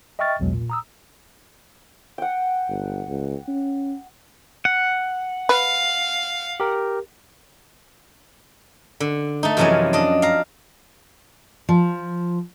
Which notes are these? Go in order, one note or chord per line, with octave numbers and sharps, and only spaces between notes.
D#5 E5 G5 C#6 F6 A6
B1 E2 B2 F#3 G#3
A#2
A#5 D#6 E6
F#5 G5
G1
C#2
C#4
F#5
B4 F5
G4 A#4
D3
A3 D#4
F#2 C3 E3 F3 C#4 G#5
D4 D#5
F5 A#5
F3